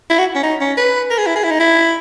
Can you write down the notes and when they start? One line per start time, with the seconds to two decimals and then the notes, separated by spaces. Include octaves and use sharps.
0.10 E4
0.19 F#4
0.35 C#4
0.43 D#4
0.61 C#4
0.78 B4
1.11 A#4
1.18 G#4
1.26 E4
1.36 G#4
1.44 E4
1.51 D#4
1.60 E4